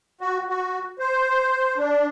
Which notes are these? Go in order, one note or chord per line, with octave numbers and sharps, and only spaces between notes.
F#4
F#4
C5
D4